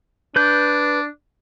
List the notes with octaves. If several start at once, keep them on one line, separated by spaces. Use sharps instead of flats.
D4 B4 G6